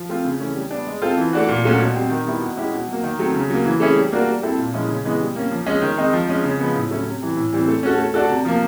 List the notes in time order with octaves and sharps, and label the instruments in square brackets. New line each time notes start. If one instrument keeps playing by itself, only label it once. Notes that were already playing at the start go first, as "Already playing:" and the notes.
Already playing: [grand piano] F3
A3 C4 F4
C#3
E3 A3 C#4
G3
B3 D4
G#3
C4 F4 A4 C5
E3
A3 D4 F#4
A#2
F#3 A3 C#4 F#4
B2
G3 C4
D#3
G3 B3 E4
B2
G#3 C#4 E4 G4
B2
F#3 A#3
D#3
F#3 A3 C4
C#3
F#3 A#3
E3
A3 C#4 E4 G#4
G3
A#3 D4 F#4 A#4
G3
C4 E4 A4
A#2
F3 G#3 C#4 E4
C#3
E3 G#3 B3
G3
A#3 C#4
F3
G#3 C#4
D#3
G#3 C4 D#4
F3
G#3 C#4
C#3
F3 G#3 B3
A2
F#3 A3 C#4 E4
C3
E3 G3
A2
E3 G3 C4
A3
C#4 F#4 A4
A3
D4 F#4 A4
C3
F3 A#3